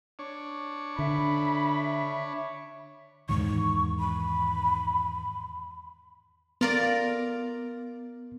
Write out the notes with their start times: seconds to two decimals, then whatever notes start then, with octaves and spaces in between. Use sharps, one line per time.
0.19 D4 C#5
0.99 D3 E5 B5
3.29 E2 G#2 D#3 C#6
3.99 B5
6.61 B3 F4 A#4 D5